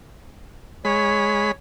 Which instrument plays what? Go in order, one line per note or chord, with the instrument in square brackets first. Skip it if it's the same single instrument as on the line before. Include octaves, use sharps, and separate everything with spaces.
[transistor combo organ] G#3 B5 [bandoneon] C#5